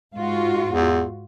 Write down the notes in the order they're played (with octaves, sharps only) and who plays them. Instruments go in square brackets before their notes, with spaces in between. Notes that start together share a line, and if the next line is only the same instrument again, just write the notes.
[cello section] G#2 F4 F#4
[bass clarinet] E2